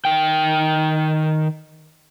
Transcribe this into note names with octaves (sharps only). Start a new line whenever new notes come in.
D#3 G5